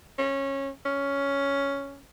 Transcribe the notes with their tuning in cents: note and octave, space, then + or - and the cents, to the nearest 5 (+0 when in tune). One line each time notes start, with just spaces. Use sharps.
C#4 -15
C#4 +5